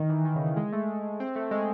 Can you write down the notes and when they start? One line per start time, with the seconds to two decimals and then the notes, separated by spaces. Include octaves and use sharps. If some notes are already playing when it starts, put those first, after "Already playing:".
Already playing: D#3
0.09 E3
0.25 D#3
0.36 C#3
0.46 D#3
0.57 G#3
0.72 A3
1.20 C4
1.36 A3
1.51 G#3